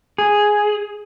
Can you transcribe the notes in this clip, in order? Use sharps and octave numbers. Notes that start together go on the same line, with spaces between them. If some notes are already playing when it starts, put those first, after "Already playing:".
G#4